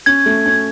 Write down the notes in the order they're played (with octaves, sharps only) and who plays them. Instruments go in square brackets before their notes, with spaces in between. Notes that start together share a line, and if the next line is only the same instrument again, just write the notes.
[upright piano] C#4 [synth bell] G#6
[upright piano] A3
C#4